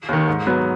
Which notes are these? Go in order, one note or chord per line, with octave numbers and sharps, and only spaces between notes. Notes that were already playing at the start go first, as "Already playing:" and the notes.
D#2 D#3
G#2
F#3 B3